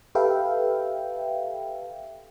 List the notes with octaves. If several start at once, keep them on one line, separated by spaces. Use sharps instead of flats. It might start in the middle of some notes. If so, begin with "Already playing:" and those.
G4 A4 B4 E5 F5 G5